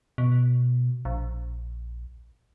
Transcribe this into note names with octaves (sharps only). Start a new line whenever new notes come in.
B2
A#1